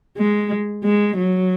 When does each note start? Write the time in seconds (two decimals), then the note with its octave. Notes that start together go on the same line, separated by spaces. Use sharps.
0.18 G#3
0.84 G#3
1.18 F#3